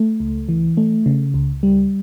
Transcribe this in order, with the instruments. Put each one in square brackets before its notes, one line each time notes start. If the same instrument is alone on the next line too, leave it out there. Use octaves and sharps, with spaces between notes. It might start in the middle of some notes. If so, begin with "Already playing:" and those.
Already playing: [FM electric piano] A3
C#2
E3
A3
C#3
C#2
G3